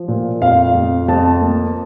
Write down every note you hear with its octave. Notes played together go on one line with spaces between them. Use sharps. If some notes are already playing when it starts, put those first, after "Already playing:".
Already playing: F3
A#2
F2 F5
F2
F2 A5
A#3